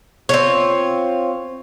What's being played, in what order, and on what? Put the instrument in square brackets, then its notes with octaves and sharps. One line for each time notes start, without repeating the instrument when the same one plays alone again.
[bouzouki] C4 F4 C#5